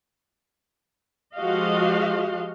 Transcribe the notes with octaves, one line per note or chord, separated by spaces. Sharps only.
F3 G#3 F#4 G4 D#5 F5